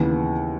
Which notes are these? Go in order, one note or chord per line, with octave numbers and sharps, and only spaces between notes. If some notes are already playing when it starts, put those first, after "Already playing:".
Already playing: D#2 C#3 E3 B3